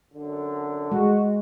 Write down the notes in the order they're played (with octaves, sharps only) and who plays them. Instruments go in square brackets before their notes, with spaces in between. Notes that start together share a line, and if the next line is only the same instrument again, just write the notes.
[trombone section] F#2 D3
[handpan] G#3 [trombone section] F#4